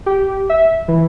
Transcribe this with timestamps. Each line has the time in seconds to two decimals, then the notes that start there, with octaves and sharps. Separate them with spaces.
0.06 G4
0.50 E5
0.88 E3